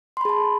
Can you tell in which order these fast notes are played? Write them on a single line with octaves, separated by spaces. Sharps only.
C6 B5 G#4 A5